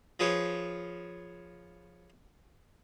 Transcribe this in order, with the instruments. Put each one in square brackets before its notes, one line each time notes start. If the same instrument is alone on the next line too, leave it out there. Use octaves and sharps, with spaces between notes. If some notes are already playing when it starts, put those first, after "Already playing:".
[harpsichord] F3 G#4 B4 C#5